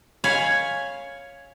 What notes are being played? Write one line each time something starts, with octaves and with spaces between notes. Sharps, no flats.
C#5 F5 G#5 B5